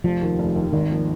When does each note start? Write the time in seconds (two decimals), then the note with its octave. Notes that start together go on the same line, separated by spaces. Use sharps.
0.04 F1 F3
0.22 D#2 D#3
0.39 F1
0.55 D#2 D#3
0.73 G#1 D#3
0.90 F3 A#3